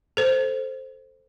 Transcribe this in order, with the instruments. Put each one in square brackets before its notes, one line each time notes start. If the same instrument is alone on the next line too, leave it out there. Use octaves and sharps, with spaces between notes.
[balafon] A4 C5